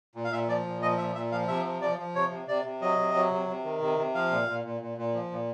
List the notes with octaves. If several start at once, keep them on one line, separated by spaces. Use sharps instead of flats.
A#2
F5
A#2 E5
F3 D5
A#2
F3 D#5
A#2 E5
A#2 E5
F3 F5
C3 E5
F3
F3 D5
F3
C3 C#5
C3
C3 D5
C3
F#3 D#5
C3
F#3
C3
C3
D#3
C3
C3
F3 F5
A#2
A#2
A#2
A#2
A#2
F3
A#2